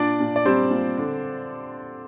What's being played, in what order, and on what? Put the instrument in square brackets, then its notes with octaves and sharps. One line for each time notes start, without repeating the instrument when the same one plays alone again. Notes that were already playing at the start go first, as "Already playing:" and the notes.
Already playing: [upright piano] A#2 [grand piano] D4 D5
[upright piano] A#2
[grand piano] D5
[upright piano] G3 [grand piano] C4 C5
[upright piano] A#2
D3